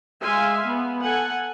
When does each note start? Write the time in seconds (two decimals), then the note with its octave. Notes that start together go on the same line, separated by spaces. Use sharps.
0.23 G#3 E5 F5 G#5 C6
0.65 B3
1.04 A4 F#5 G#5